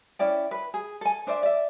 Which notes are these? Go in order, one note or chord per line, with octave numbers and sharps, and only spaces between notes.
C#4 E4 D5 G5
B4
G#4
A4 G#5
D4 C5 D5 E5
D5 E5